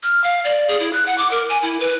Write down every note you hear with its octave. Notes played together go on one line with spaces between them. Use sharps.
F6
F5
D5
G#4
E4
F#6
F#5
D6
A#4
G#5
E4
B4